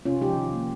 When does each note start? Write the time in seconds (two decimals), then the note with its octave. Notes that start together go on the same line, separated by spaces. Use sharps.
0.05 C3 C#4 F4
0.21 F3 G#3 D#4 G4
0.37 D#3
0.53 A#3